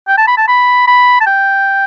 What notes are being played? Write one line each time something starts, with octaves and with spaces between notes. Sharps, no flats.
G5
A5
B5
A5
B5
B5
A5
G5